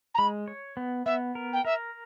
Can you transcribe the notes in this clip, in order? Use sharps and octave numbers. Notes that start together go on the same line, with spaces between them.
A#5
G#3 B5
C#5
B3
B3 E5
A#4
G5
A#4 E5